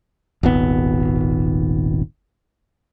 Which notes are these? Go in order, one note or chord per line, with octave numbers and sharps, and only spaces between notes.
D#1 G#1 B3